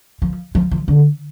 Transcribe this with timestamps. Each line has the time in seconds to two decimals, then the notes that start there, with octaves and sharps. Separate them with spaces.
0.22 F3
0.55 F3
0.71 F3
0.88 D3